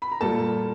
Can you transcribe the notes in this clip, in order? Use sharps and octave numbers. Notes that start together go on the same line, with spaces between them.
B5
A#5
A#2 G3 A#3 A4 A5